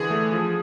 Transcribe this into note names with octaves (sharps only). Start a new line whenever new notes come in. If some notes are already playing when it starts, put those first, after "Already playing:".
Already playing: D3 E3 G#4
A3
F3